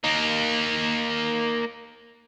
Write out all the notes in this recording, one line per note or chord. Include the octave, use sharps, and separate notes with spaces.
A#3 D#4